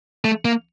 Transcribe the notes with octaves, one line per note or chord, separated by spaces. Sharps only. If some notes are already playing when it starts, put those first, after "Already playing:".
A3
A#3